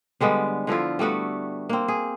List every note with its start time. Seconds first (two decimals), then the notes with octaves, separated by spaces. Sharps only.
0.21 D3 G3 G#3 B3
0.67 D3 F3 E4 F4
0.99 G3 A3 B3 F#4
1.69 A#3 C4
1.88 G#4